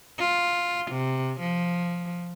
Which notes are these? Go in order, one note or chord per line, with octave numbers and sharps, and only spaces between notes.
F4
C3
F3